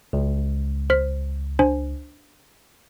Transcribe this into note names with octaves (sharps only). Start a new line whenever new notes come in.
C#2
C5 F6 B6
D4 C5 G#5